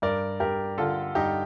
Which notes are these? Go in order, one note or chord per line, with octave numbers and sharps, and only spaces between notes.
G2 A#4 D5
G2 G4 A#4
D3 F4 A4
G2 D#4 G4